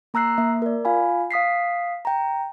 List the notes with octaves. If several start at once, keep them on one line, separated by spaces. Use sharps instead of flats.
A#3 A#5 E6 F#6 C7
A#3 E5
A#4 D5
F4 F5 G#5 B5
F5 D#6 B6 C7
G5 A#5